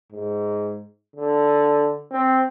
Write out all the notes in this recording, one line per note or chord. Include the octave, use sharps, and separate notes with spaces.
G#2
D3
C4